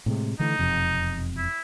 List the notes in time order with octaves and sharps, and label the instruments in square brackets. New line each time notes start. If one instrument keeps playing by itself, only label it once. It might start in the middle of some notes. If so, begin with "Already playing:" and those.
[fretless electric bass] A2 C3 G#3
[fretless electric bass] D3 E3 A3 [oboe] D#4
[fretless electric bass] E1 F2 C3
[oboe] E4